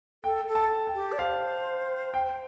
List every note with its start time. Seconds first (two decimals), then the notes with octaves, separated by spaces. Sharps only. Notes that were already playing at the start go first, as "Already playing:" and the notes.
0.24 A4 G5
0.47 A4
0.55 A5
0.87 G5
0.95 G4
1.12 D5
1.18 C5 F5
2.14 G5